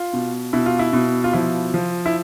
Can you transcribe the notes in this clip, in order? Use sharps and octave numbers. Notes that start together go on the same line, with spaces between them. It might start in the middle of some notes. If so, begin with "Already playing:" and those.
Already playing: F4
B2
B2 E4
F4
E4
B2
F4
F3 E4
F3
E4